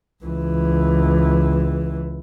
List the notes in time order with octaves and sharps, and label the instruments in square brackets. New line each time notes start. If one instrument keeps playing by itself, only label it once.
[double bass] C#2 E3